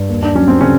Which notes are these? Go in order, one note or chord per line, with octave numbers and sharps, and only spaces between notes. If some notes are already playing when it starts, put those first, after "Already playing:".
Already playing: G2
D#2
D4
F#3 C#4
C4
C#3 C#4